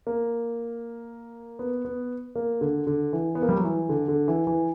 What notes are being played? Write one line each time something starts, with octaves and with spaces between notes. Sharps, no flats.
A#3
B3
B3
A#3
D3
D3
E3
B3
A#3
G3
F#3
E3
D3
D3
E3
E3